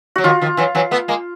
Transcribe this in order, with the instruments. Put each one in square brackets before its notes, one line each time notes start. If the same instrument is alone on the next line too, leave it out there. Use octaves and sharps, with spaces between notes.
[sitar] F#3 [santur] F#4
[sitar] D#3 F3 [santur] F4
[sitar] D#3 F3
E3 F#3
E3 F#3
A3 B3
G#3 A#3